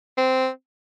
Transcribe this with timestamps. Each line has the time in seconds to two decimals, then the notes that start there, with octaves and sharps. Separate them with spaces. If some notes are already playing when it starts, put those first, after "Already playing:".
0.18 C4